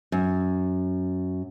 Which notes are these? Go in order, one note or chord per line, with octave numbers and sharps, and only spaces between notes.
F#2